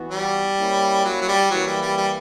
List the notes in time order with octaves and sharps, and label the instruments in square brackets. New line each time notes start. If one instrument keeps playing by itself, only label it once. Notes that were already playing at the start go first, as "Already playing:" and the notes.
Already playing: [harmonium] E3 B3 F#4
[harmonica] G3
[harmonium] A#3 C#4 E4
[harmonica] F#3
F#3
G3
[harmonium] E3 A#3 E4 B4 [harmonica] F#3
[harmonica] G3
G3
G3